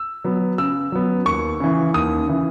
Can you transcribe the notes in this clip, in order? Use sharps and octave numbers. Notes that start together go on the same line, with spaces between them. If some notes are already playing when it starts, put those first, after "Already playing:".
Already playing: E6
F#3 B3
C#3 E6
F#3 B3
D#2 C#6
C#3 E3
D#2 D#6
C#3 E3